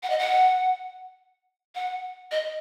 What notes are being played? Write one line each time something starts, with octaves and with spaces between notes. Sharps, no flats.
F#5
D#5
F#5
F#5
D#5